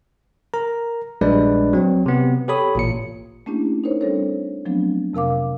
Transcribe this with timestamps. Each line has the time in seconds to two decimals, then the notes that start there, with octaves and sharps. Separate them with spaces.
0.54 A#4 A#5
1.21 A#1 G3 G#3 D4 B4 D5
1.73 F#3 C4
2.06 C3 B3
2.48 G4 A4 C#5 B5 D#6
2.75 A1 A#2 C#7
3.46 A3 A#3 C#4 D4 E4 G4
3.84 D#4 A#4 C5 C#5
4.01 G3 C4 D4 A4 C5 C#5
4.65 F3 F#3 A3 B3 C4 D4
5.13 F2 C3 A#4 F5 D6